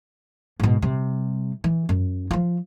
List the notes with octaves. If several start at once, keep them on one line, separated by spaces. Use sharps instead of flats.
G#2 B2
C3 G3
E3
F#2
F3 F4